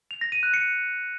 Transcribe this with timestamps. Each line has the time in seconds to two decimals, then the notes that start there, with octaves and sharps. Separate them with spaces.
0.11 F7
0.21 A#6
0.32 D#7
0.43 F#6
0.54 C#7